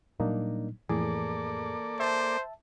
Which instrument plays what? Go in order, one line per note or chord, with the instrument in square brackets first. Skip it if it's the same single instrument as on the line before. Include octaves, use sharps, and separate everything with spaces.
[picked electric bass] A#2 F#3 G3 [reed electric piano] A#3 D4 D#4
[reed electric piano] F2 A2 G#4 [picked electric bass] E3 [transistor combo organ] A#3 A4 D5
[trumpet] C5 [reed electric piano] E5 A5